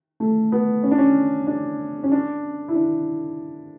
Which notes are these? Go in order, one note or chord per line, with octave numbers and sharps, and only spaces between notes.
A3
B3
C#4
D4
C#4
D4
C#4
D4
E4
D4